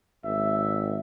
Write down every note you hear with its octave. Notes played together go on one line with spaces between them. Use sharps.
G#1 E5